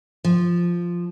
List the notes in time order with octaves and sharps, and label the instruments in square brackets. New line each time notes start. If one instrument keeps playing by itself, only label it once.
[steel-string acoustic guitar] F3